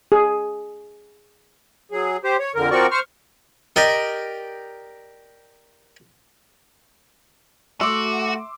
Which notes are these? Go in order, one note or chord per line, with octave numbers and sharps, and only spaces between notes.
G#4
F#3 G#4
G4 C5
C#5
F2 D3 A#4
F3 C4 F#4 A#4 D5 C#6
C5 C#6 F6
G4 A#4 D5 D#5 G5
A3 F#4 E5 C6 D6 E6